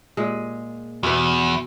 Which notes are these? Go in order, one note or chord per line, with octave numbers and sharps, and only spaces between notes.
A#2 G#3
E2 B2 E4 B4